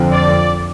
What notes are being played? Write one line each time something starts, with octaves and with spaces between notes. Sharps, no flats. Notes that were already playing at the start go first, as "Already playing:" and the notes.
Already playing: F2 D3 F3 C4
D5